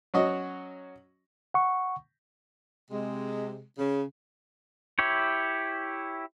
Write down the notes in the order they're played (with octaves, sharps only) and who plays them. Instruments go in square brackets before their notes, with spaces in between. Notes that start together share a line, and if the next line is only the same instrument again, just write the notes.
[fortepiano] F#3 C#4 F#4 D#5
[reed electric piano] F#5 C#6
[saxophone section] C3 G#3
C#3
[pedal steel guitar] E4 G4 C#5